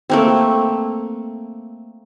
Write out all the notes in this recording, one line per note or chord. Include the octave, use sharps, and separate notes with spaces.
A3 A#3 C4